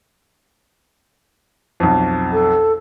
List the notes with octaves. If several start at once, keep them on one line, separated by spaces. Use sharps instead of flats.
B1 F2
A4